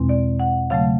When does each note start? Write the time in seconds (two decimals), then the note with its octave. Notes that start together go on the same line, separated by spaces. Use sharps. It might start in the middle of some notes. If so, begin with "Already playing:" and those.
Already playing: E2 B2 G#3 C4
0.09 D5
0.40 F#5
0.70 C#3 F#3 A3 F5